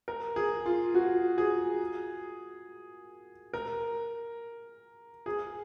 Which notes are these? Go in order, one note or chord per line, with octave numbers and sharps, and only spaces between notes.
A#4
G#4
F4
F#4
G#4
A#4
G#4